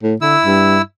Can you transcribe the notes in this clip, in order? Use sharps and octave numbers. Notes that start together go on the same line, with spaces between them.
A2
D3 E4 E6
G2